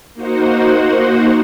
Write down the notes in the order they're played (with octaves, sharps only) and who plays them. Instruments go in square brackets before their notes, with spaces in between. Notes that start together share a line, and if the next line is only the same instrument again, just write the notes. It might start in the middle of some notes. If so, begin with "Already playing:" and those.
[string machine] A#3 D#4 F#4 C5 F#5